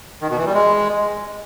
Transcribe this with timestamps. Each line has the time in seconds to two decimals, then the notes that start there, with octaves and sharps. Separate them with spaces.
0.22 D#3
0.30 B2
0.38 E3
0.46 G3
0.54 G#3